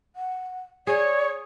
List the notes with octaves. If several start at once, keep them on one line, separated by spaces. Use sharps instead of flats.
F#5
G#4 C#5 D5